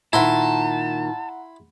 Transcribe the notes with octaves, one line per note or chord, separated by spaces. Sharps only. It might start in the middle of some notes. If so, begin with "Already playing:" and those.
A#2 D#3 E4 F#5 A5 A#5 C6